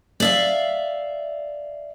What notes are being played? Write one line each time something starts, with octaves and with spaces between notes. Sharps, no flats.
D5 E5 F5